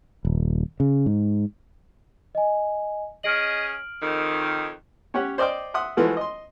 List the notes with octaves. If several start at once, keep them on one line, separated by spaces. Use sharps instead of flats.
D#1
C#3
G#2
D#5 G#5
C#4 G#4 D#5 F6 D7 F#7
F2 D#3
C#4 G4 C#5 F#5
C5 D5 D#5 G5 D6
E5 F#5 C6 D#6
E3 F3 G#3 A3 F#4
D#5 C6